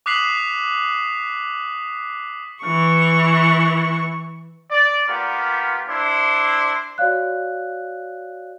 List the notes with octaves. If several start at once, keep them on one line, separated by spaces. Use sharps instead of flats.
D6 D#6 F#6 B6 C7 F#7
E3 C#6
D5
A#3 B3 F4 G4
D4 E4 C5 D6
F#4 C#5 D5 F5 F#6